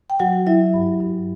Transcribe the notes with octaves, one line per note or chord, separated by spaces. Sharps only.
G5
F#3 F#4 F#5
F#3 E4 E5
G2
G2